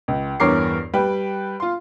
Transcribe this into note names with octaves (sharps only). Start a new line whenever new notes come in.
C#2
E2 G2 A#4 C#5 D6 C7
G3 B4 G5
F4 C6